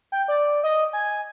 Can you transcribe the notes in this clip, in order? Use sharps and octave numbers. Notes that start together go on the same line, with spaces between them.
G5
D5
D#5
G#5